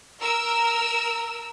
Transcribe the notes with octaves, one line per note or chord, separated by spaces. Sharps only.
A#4 E6